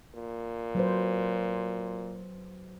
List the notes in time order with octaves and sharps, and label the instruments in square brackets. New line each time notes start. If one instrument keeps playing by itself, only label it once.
[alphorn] A#2
[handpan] F#3 B4 C5